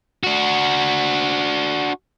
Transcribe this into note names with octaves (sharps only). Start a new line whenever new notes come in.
D4 F#4